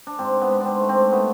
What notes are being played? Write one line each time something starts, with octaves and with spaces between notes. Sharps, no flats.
D4
G#2 C4
B3
G#2
C4 D4
A3
C4
A3 B3